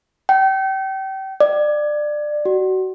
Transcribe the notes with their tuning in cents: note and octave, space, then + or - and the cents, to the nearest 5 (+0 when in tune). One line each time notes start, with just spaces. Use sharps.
G5 -30
D5 +20
F#4 +25